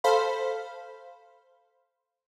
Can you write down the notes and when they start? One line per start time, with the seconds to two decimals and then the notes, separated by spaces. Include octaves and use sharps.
0.04 A4 C5 F5 B5